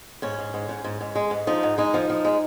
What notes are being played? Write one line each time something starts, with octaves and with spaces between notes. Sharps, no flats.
G#2 C#4
G#2
G#2
G#2
G#2
G#2
G#3
G#2
F3 D#4
G#2
G#3 D#4
F3
F3
G#3